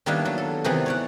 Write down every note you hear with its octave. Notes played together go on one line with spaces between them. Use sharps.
D#3 G3 A#3 B3 D4 E4
F#3
A4
C3 D#3 E3 B3
C#5 D5 F#5